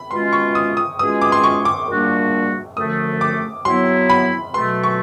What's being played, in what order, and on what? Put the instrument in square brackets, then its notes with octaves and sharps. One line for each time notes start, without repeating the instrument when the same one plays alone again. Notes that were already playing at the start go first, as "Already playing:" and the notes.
Already playing: [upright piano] B5
[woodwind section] B2 G#3 C#4 F4 [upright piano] C6
[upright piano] C#6
D#6
D#6
[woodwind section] B2 G#3 C#4 F4 G#4 [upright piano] D#6
[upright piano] D6
C6
C#6
D6
[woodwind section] A#2 G3 A#3 D4 F#4
[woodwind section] F#2 D3 F3 A3 [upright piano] D#6
[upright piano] D6
[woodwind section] F#3 B3 E4 [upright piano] C6
[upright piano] B5
[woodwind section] B2 F#3 A3 [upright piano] C6
[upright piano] C#6